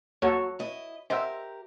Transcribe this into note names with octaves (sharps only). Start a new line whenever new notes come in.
D#2 F#3 F#4 A4 C#5
E4 D#5
G4 A#4 C5 D#5 E5 F#5 E6